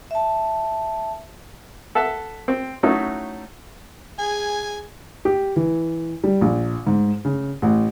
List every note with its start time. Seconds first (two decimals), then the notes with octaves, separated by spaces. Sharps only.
0.11 E5 A5
1.95 A4 E5 F#5 A5
2.48 C4
2.83 F#3 A3 C#4 D#4 E4 F#4
4.19 G#4 G#5
5.25 G4
5.56 E3
6.24 G3
6.41 A#1
6.87 G#2
7.25 C#3
7.62 A1